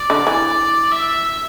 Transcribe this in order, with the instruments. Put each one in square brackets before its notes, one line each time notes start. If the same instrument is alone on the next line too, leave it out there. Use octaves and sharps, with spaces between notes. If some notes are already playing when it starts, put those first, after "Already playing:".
Already playing: [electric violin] D5
[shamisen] D3
E3
[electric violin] E5